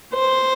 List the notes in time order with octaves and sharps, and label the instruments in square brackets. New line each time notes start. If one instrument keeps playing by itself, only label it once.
[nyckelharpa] C5